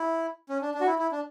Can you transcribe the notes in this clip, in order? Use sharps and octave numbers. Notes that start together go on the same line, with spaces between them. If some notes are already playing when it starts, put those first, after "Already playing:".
Already playing: E4
C#4
D4
D4
F#4
E4
E4
D4